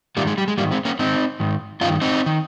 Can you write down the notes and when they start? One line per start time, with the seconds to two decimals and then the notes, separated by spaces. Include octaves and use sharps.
0.17 G#2 D#3 G3 A#3
0.27 G#3
0.38 G3
0.48 G#3
0.58 G#2 G3 A#3
0.62 D#3
0.72 G#3 C4
0.85 A#3 C#4
0.99 G#2 D#3 C4 D#4
1.40 G#2 D#3
1.81 G2 C#4 F4
1.84 D#3
2.02 C4 D#4
2.26 D#3